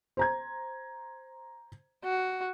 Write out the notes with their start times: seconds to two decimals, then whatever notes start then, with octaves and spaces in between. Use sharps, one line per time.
0.17 C5 A#5 G#6
2.04 F#4